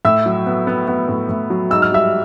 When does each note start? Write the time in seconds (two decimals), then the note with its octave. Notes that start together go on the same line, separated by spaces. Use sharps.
0.05 A2 E5 E6
0.26 F#3
0.47 B3
0.67 B3
0.88 B3
1.09 A2
1.29 A2
1.50 F#3
1.71 G#2 E6
1.82 F6
1.92 G3 E5 E6